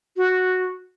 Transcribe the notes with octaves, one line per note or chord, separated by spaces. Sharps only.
F#4